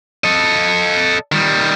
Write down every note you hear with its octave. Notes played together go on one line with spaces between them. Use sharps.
A4 D#5
D#3 G3